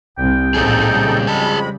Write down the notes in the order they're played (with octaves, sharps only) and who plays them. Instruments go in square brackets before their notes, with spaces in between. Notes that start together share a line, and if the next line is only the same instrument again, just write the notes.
[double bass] C2 C3 [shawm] G5
[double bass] A1 [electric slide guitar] A#2 C4 G#4 [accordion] D#4 A4
[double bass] C#3 G3
[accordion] F2 G#3 B5 [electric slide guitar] G#4 A5